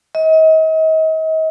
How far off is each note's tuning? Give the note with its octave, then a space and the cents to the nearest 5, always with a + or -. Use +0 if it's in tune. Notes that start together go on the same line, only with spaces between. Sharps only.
D#5 +40